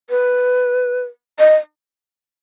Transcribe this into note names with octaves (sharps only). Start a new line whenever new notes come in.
B4
D#5